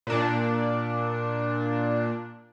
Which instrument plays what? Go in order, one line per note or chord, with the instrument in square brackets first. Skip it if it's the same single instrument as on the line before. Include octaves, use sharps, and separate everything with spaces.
[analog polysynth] A#2 D4